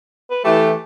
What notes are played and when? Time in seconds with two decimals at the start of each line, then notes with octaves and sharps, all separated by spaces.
0.31 B4
0.45 E3 A3 G4